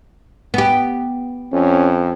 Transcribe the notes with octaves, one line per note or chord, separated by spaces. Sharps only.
B3 G4
F2 C#4